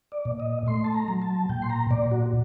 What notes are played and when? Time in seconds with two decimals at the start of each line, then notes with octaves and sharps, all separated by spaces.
0.12 D5
0.25 A#2
0.40 D#5
0.66 A3 C6
0.84 A5
0.94 A#5
1.08 F#3
1.22 A5
1.49 A#2 G5
1.62 C6
1.70 A#5
1.91 A#2 D5
2.11 F#4